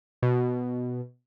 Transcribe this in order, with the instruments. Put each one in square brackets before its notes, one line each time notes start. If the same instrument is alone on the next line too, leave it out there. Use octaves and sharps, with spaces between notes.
[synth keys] B2